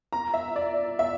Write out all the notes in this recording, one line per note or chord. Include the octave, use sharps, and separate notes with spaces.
A#5
E5
D5
E5